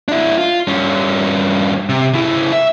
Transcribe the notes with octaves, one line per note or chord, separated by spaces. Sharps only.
D4 E4
F4
G2 C#4
C3
C#3 E4
E5